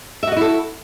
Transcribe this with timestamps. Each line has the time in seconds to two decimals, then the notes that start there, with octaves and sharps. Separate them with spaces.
0.23 E5
0.27 F#4
0.32 D#5
0.37 E4
0.41 A4